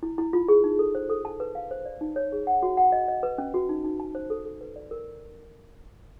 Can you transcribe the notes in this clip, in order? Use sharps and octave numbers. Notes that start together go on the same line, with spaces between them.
E4
E4
F4
G#4
D#4
A4
C5
A4
A5
B4
F5
C5
D5
D#4
C#5
G#4
F#5
F#4
F#5
D#5
D#5
B4
C#4
F#4
D#4
D#4
A5
C5
A4
A4
B4
D5
A#4